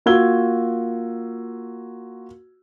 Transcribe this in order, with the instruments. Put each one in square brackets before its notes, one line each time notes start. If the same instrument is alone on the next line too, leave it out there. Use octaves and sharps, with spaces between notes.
[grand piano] A#3 F4 F#4 E6 G#6 G7